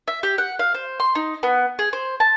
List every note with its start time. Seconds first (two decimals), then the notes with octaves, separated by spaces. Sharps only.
0.07 E5
0.23 G4
0.38 F#5
0.59 F5
0.74 C5
1.00 C6
1.15 D#4
1.43 B3
1.79 G#4
1.93 C5
2.20 A5